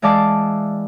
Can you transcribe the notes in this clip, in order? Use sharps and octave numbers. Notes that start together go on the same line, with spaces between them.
E3 G#3 D5 F5 A5 D6